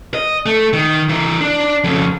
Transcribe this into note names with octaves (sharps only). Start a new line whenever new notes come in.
D#5
A3
D#3
E3 A#4
D4
F2 C#3